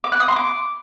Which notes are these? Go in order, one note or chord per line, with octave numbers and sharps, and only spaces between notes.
D6
F#6
D#6
C6
D6